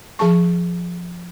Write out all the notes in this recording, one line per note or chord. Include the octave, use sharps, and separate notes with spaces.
F3 G#4 A5 C#6